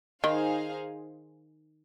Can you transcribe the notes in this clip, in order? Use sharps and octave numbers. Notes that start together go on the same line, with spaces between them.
D#3 D#4 G#4 C5 F5